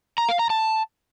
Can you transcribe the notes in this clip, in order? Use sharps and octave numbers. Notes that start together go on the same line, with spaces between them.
A#5
F5
A#5
A5